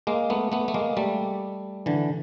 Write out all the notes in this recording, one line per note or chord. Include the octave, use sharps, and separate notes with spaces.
G#3 A#3
A3 B3
A3 B3
A3
G#3 A#3
G3 A3
D3 E3